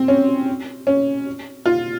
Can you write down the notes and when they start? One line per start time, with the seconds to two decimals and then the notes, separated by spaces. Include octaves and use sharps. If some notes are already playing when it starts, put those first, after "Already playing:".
Already playing: C4
0.08 C#4
0.87 C#4
1.66 F4